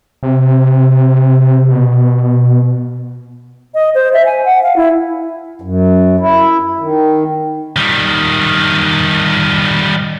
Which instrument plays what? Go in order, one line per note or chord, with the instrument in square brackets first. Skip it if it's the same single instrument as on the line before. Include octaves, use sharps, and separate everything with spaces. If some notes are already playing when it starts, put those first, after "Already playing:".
[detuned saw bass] C3
B2
[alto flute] D#5
C5
E5
G#5
F#5
F5
E4
[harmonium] F#2
E4
D#3
[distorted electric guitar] D#3 G3